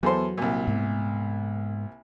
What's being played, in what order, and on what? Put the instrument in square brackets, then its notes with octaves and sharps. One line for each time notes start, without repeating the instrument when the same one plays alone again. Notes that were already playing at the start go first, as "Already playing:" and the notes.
[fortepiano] E2 A4 C5 [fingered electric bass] F#3
[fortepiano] C2 A#2
[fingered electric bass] G#2 G#3 B3